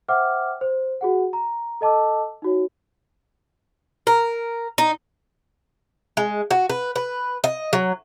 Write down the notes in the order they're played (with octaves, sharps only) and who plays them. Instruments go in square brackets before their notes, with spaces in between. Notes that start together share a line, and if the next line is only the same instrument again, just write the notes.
[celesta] C5 E5 F#5 G5 D6 F6
C5
F#4 G#4 F#5
A#5
A4 D#5 A5 D6 E6
D#4 F#4 C#5
[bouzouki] A#4
D#4
G#3
F#4
B4
B4
D#5
F#3